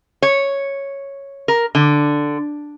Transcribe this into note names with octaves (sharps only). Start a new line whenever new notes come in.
C#5
A#4
D3